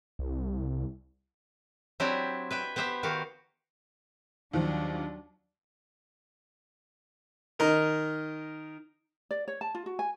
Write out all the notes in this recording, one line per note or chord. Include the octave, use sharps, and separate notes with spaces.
C2
F#3 C4 D4 E4 G4 E5
B4 E5 G5
B3 G4 C5 E5
D#3 F#4 G4 F5
D#2 D#3 F3 F#3 D4
D#3 A#4 D#5
D5
C#5
A5
F4
F#4
G#5